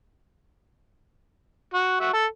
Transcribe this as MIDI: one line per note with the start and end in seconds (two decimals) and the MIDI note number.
1.74 1.96 66
2.00 2.09 66
2.00 2.09 76
2.13 2.25 69